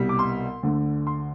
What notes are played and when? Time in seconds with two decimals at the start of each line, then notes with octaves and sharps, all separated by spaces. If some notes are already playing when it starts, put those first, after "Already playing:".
Already playing: C2 B2 G3 B3
0.09 D6
0.19 C6
0.63 D2 D3 A3
1.07 C6